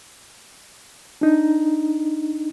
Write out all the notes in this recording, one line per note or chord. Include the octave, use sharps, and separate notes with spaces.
D4 D#4